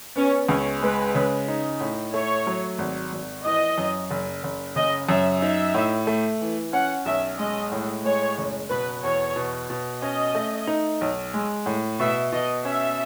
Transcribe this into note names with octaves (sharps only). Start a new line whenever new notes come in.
B3 C#4
C#2 C#4
G#3 B4
C#3
D#4
A2
A3 C#5
F#3
G#1
G#1
E3 D#5
F#2
F#1
F#1
C#3 D#5
F#2 E5
D#4 E5
A2
A3
E3
C#4 F#5
B1 E5
G#3 D#5
A2
G#3 C#5
F#1
B2 B4
E2 C#5
B2
B2
C#4 D#5
A3
D#4
B1
G#3
A2
B2 E5
B2 D#5
C#4 E5